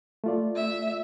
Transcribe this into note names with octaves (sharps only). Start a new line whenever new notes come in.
A3 F4 D5
E5